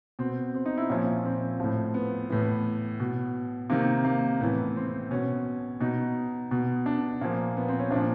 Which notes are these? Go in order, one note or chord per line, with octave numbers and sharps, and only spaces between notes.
B2 C4
C4
D#4
E4
A#2 F3 C#4
C4
A2 F3
B3
A2 E3 B3
B2
C3 D#3 A#3
A#3
A2 E3 B3
C4
B2 C#4
B2 D#4
B2
D4
A#2 F3 A#3
B3
C4
C#4
A#2 F3 D4